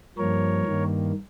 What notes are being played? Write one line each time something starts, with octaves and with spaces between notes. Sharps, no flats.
G2 F3 A#3 A#4 C#5
G2 D#3 A#3